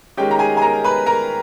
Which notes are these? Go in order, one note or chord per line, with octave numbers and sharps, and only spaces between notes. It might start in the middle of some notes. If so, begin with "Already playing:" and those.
D#3 G#3 C#4 G4 G5
A#5
G#4 G#5
G#5
A#4 A#5
B4 B5
A#4 A#5